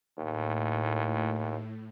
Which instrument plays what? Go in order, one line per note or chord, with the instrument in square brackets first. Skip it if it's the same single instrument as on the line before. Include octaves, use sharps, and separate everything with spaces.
[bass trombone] D#2 [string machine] A2